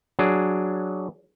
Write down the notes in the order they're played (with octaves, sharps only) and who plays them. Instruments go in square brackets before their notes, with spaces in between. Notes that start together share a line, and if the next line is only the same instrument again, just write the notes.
[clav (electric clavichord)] F#3 D4 G#4